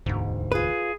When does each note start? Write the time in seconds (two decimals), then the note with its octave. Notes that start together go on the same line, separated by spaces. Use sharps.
0.06 E1 D2 G#2
0.52 F4 G#4 B4